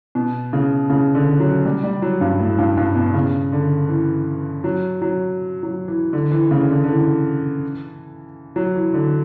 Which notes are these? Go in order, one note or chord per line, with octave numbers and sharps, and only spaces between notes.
B2
C#3
C#3
D3
F#3
G3
G3
F#3
G2
A2
G2
G2
B2
C#3
D3
E3
F#3
F#3
F#3
E3
D3
E3
C#3
D3
D3
E3
F#3
E3
D3